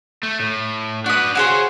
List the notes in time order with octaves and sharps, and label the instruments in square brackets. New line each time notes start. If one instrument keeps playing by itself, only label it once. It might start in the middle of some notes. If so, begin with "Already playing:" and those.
[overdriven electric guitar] A3
A2
[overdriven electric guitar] D4 B4 [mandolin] F#4 D#6
[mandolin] F#4 G#4 C5 [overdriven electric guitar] C#5 F5